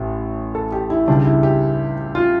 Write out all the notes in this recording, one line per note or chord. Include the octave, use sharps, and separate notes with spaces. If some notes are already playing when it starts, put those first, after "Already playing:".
Already playing: A1 A2
A4
G4
E4
C#2 C#3 G3 D4
E4
G4
F4